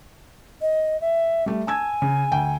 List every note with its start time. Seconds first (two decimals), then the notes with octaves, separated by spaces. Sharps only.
0.61 D#5
1.01 E5
1.46 G3 A3
1.67 G#5 A5 E6 G#6
2.02 C#3
2.32 D2 G5